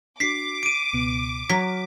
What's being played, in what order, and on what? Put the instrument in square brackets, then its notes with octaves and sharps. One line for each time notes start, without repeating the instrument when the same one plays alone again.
[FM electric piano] D4 F#4 [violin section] D6 [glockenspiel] B6 C7
[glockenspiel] D7 D#7
[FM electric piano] C#2 B2 B3
[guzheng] F#3 [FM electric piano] F6 [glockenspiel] B6